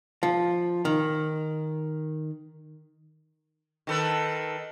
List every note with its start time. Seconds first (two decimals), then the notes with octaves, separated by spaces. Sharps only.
0.23 F3
0.85 D#3
3.87 D#3 A4 B4